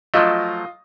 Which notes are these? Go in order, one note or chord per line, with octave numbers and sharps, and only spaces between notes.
F3 F#3 A3 F4 D#5